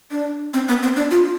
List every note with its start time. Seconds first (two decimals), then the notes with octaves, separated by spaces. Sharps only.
0.11 D4
0.54 C4
0.68 B3
0.83 C4
0.96 D4
1.11 F4